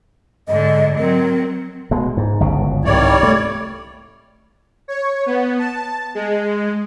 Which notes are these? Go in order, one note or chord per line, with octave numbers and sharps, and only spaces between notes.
G#2 D3 D#5
F#3 C4 A#4
B2 G#3
G#2
G1 C#2 B2
C2 G#2 D#3 G3 C#5 D5
A3
C#5
B3
A5
G#3